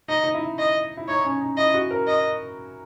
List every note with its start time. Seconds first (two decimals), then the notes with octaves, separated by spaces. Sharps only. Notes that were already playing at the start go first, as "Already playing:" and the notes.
0.08 D#4 D#5
0.23 D#4
0.34 E4
0.59 D#5
0.97 E4
1.08 D#4 C#5
1.25 C#4
1.41 D#4
1.57 E4 D#5
1.74 F#4
1.91 A#4
2.07 D#5